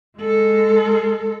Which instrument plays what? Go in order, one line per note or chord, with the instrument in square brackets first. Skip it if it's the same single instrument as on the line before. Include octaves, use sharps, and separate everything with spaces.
[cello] G#3 A4